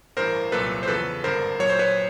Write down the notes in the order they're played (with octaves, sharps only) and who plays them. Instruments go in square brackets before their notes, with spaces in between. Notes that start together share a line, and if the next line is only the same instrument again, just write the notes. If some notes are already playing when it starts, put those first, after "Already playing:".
[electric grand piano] A1 G2 E3 A#4 C5
C2 A#2 F#3 A4 B4
C5
E2 C#3 F3 A4 B4
G#1 G2 D3 A#4 C5
A#1 A#2 F#3 C#5
C5
B4 C#5